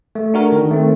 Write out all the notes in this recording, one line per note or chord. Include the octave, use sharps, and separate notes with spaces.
A3
D4 F#4 A#4
D#3
A3 C4